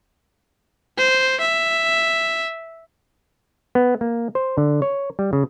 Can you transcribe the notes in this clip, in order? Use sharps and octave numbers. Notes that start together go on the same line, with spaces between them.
C5
E5
B3
A#3
C5
D3
C#5
G3
C#3